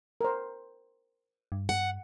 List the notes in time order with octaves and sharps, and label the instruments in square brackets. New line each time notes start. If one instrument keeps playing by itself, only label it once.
[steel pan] A#4 C5
[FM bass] G2
[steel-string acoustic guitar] F#5